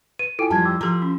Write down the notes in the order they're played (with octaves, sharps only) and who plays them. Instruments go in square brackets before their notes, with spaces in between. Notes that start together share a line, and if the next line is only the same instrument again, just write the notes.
[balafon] B4 [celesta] D#7
[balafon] E4 F4 [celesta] A4 G5 G#5
[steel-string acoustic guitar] F2 F3 G3 [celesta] A5 G#6
[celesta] G5 D6 E6
[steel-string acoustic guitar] F3 [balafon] G4 A4 A#5
[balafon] C#4